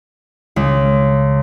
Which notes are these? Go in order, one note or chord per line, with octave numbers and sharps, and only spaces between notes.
C#2